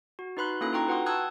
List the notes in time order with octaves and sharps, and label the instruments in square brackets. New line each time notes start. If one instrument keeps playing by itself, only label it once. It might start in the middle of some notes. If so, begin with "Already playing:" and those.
[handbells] F#4
D#4 F#4 B4 B5 C6 F#6
A#3 C#4 E4 A4 D#6 F#6
D#4 F4 A4 G5 A#5 C#6
F#4 B4 F#5 G5 C6 D#6
A5 D#6 E6 F#6 G#6